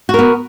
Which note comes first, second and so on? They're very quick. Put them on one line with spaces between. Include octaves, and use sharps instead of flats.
F#4 A#4 B3